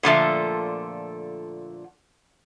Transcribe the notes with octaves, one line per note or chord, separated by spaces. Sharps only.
A#2 D3 F3 A3